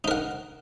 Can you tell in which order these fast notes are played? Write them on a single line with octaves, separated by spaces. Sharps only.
D#4 A#4 F#5